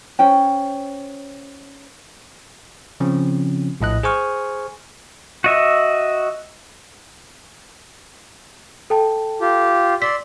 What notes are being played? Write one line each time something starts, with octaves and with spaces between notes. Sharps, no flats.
C#4 C5 G5
C#3 F3 C4 C#4
A#1 A2 D#5 F#6
G#4 C5 G#5 C#6 F6
F#4 D#5 E5
A4 G5 A5
F4 G4
D5 C6 E6 B6